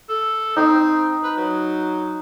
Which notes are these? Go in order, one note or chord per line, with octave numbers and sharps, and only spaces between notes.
A4
C4 D#4
B4
F#3